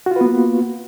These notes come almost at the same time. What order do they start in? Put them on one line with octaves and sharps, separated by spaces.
F#4 F4 B4 B3 A#3